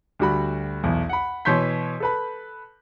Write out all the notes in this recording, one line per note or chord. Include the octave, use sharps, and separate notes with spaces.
D2 G3 F#4 B5
B1 E2
F#5 B5
B2 E3 C#5 C6 G6 B6
A4 B4 B5